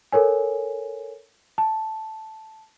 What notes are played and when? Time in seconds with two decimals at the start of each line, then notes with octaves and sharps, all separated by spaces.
0.12 A4 A#4 C#5 G#5
1.58 A5